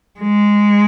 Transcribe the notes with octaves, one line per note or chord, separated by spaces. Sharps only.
G#3